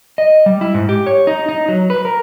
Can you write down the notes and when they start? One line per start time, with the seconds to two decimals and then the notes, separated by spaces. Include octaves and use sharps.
0.18 D#5
0.46 G3
0.61 E4
0.74 G#2
0.89 G4
1.06 C#5
1.27 D#4
1.49 D#4
1.68 F#3
1.90 B4
2.05 A#4